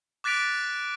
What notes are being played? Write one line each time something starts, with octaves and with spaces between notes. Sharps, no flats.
D6 F#6 A6 B6 D7 F7